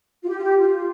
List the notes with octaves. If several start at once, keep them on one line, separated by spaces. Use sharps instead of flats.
F4
G4
F4
G4
F4